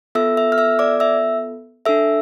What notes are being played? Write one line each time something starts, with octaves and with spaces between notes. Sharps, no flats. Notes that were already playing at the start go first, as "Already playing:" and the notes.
B3 F4 A4 E5 E6
E5 E6
F6
E5 E6
D5 D6
E5 E6
D4 A4 E5 E6